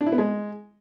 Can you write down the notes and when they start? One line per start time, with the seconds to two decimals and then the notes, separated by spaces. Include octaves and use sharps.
0.01 D4
0.06 E4
0.12 B3
0.18 G#3